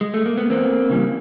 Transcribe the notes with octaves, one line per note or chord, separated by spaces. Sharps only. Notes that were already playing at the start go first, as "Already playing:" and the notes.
G#3
A3
A#3
B3
E2 A#3 C4
C#3 E3 G3